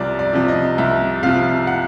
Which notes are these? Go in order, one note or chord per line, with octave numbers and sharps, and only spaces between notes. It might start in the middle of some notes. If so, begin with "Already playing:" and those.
Already playing: C2 C3 F3 D5
D5
C3 F3
D#5
C2 E5
C3 F3 F5
F#5